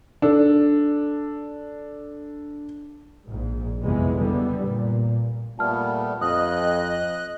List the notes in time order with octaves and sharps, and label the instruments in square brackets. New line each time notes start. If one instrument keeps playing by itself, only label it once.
[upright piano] D4 A4
[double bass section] A#1 G#2
F#1 F2 C3 E3 G#3 B3
D3 G3 B3
A#2
[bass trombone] A#2 [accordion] G3 A3 B3 [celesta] A5 F6
[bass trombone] F2 [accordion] D#5 F#6 [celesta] D#6